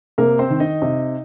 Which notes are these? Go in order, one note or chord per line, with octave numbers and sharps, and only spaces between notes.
C3 A#3 A#4
C4 C5
D#3
D#4 D#5
C3